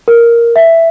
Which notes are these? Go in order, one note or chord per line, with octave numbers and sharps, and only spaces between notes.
A#4
E5